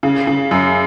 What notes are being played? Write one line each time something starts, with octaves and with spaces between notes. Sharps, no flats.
C#3
C#3
F#2